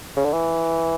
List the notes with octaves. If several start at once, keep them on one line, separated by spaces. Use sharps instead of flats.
C#3
D3
E3